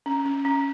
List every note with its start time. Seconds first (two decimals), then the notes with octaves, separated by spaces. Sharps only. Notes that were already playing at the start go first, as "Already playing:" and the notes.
0.06 C#4
0.25 C#4
0.45 C#4